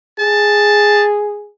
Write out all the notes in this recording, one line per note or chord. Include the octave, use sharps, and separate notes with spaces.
G#4 A5